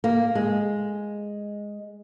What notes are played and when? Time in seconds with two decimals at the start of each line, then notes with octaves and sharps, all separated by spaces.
0.04 A#3
0.35 G#3